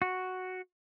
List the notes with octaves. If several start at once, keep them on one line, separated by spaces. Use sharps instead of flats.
F#4